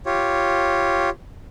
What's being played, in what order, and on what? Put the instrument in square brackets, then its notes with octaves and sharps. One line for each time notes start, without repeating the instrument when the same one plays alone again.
[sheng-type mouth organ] F4 G4 C#5